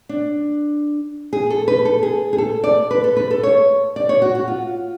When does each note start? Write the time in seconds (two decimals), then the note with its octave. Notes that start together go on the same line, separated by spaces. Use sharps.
0.09 D4
1.33 G#4
1.50 A4
1.68 B4
1.85 A4
2.03 G#4
2.33 G#4
2.38 A4
2.64 D5
2.91 B4
3.04 A4
3.17 B4
3.31 A4
3.43 C#5
3.96 D5
4.09 C#5
4.22 F#4
4.35 F#4
4.48 F4